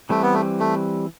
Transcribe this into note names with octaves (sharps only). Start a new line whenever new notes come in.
E3 G3 A3 C4
B3
A3
A3